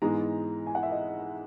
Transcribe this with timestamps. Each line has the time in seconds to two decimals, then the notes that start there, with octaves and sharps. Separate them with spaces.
0.02 G#2 E3 G#3 B3 A#5
0.67 G#5
0.75 F#5
0.83 E5
0.91 D#5